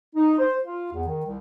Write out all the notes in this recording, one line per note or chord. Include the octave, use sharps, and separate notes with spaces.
D#4
C5
F4
E2
D#3
C2